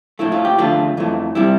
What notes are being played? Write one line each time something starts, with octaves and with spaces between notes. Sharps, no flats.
A2 F3 A3 E4
F4
G4
E2 D3 F3 A3 F4
F2 E3 A3
C3 G3 E4